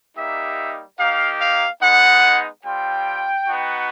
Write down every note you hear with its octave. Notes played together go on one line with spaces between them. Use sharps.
G3 A#3 D#4 G4 E5
A#3 D#4 G4 F5
F5
G#3 B3 D#4 F#5
G3 C4 F4 G5
B3 D#4 F#4